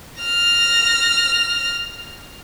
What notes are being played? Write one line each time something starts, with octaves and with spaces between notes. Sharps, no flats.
F6 A#6